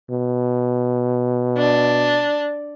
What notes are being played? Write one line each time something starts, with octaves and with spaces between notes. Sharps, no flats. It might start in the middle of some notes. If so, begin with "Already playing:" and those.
B2
D4